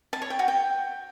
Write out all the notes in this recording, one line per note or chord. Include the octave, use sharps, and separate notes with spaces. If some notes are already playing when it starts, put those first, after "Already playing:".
A5
C#5
G5
F#4
G5